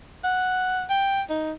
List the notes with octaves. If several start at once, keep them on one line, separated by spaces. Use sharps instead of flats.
F#5
G5
D#4